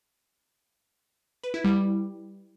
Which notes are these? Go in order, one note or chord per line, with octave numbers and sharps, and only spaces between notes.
B4
E4
G3